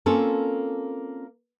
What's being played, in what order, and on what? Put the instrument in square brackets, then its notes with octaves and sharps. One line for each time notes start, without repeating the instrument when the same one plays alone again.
[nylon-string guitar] A#3 C4 C#4 F4 A4